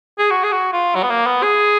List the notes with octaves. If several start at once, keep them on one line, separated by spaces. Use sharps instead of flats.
G#4
F#4
G#4
F#4
F4
F#3
B3
A#3
B3
G#4